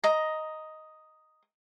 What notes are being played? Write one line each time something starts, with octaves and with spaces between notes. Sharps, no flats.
D#5 A#5